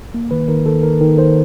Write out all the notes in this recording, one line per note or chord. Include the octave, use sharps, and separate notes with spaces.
A#3
D#3 B4
D#3 A#4
D#3 A4
D#3 A#4
D#3
D#3 C5